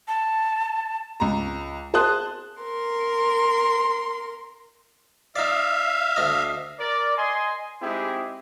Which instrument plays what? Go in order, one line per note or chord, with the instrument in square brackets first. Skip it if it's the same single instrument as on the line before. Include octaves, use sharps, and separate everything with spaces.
[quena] A5
[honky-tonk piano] C#2 A#5
G#4 C5 A5 C6 D#6 F#6
[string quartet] A#4 C6
[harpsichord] D#4 D5 [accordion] E5 F5
[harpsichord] D2 D4 D#5
[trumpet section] A#4 D5
D#5 G#5 C6
G#3 C4 D#4 E4 G4 G#4